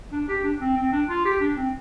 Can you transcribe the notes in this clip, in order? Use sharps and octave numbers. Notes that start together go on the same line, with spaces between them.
D4
G4
D4
C4
C4
D4
F4
G4
D4
C4